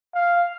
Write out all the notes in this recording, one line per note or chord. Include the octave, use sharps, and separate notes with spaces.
F5